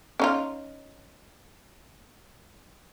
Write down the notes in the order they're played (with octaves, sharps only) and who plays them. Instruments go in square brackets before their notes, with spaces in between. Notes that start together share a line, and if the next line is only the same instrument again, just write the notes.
[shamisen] C#4 D#4 F4